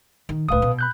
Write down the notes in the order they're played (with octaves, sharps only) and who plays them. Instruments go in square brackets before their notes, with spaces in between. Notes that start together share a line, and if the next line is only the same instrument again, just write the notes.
[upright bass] D#3
[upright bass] D1 D2 [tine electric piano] B4 F5 D#6
[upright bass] B2
[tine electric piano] B5 F#6 G6